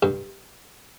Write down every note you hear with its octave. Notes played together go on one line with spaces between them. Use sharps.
G2